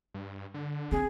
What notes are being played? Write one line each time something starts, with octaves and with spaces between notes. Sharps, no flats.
G2
D3
C4 G#4